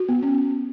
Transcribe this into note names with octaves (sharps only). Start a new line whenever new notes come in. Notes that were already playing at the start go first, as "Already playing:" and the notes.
Already playing: F#4
B3
C#4